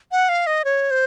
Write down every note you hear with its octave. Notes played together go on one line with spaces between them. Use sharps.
F#5
F5
D#5
C#5
C5